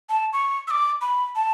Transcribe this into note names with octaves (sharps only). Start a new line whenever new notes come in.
A5
C#6
E6
D6
B5
A5